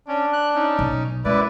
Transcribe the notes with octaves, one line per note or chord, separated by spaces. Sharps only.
C#4 D4
F#6
C#4 D#4
B1
F#2 G#3 E4 B4 D5